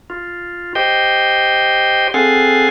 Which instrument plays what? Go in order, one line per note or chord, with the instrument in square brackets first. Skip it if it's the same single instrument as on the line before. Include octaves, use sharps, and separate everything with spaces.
[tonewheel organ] F4
G4 C5 D#5 G5
C4 G#4 A4 F5 F#5 G#5